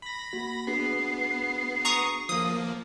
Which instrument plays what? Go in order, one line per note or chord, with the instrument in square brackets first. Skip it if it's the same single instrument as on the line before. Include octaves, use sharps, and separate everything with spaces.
[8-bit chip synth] B5 A#6
[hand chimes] A#3 F#4
[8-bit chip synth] B3 [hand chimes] D4 F#4 G#4 [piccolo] C7
[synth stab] A#5 C#6 D#6
[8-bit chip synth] F3 A#3 [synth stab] D#6